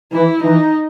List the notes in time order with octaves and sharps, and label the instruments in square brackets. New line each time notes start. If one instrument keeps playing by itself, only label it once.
[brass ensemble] E3 [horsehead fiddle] E4
[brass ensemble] E3 [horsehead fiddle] D#4